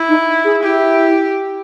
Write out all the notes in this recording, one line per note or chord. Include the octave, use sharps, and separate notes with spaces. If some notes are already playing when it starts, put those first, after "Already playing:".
Already playing: E4
D#4
G#4
E4 G4